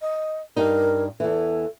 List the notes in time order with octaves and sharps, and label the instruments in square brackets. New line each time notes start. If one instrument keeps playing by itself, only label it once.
[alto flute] D#5
[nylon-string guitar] G2 G3 D#4 [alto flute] A#4
[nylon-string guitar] E2 E3 [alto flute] A4